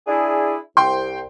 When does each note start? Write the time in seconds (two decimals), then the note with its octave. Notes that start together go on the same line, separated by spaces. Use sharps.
0.07 D4 E4 G#4
0.77 C2 G5 C6